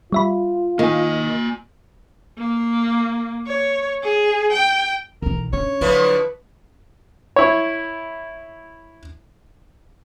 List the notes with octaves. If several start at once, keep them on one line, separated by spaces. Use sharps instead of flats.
G3 F4 E5 B5
D#3 A#3 G#5
A#3
C#5
G#4
G5
B1 E3 A#4
C#4 D4 C#5
D3 F3 F#3 E4 B4
E4 C#5